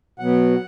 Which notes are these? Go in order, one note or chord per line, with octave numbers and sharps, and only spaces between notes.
B2 F#3 B3 F#5